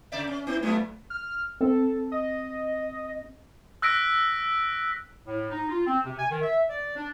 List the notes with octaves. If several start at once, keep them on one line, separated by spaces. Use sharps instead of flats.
C#3 D5 E5
C#4
B3 E4
F3 F#3 A3 B3
F6
C4 A4
D#5
E6 F#6 A#6 B6 D7
A2
D#4
F4
C4
C3
G#5
D#3
E5
D5
D4